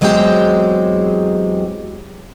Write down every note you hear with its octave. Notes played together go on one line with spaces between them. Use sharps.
E2 F#3 G#3 C4 G4 G5